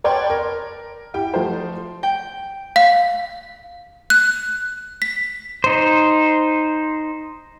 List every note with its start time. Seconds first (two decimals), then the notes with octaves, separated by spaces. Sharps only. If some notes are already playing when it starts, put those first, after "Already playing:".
0.04 B4 C#5 D5 G5 A5 C6
0.30 A#4
1.14 E4 G4 G5
1.34 F3 A3 C5
2.03 G5
2.76 F5
4.10 F#6
5.02 B6
5.64 D#4 C5